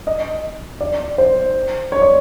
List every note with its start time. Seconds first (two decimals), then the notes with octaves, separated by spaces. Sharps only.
0.07 D#5
0.81 D5
1.18 C5
1.92 C#5
2.02 D5